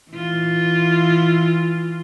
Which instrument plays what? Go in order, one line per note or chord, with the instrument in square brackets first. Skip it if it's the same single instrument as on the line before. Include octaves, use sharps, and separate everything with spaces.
[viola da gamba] E3 F4